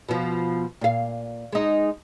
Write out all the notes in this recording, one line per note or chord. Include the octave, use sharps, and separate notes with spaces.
B2 F3
A#2 F5
G#3 D#4